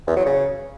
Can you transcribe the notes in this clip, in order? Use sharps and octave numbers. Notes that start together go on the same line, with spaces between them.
E2
F#3
C#3